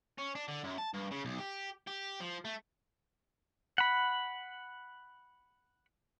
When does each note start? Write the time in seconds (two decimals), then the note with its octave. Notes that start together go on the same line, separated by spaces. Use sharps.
0.19 C#4
0.35 D4
0.48 D3
0.64 F#2
0.78 A5
0.94 G2
1.11 C#3
1.25 B1
1.39 G4
1.88 G4
2.21 F3
2.45 A3
3.78 F#5 B5